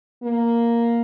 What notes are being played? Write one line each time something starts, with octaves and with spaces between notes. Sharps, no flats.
A#3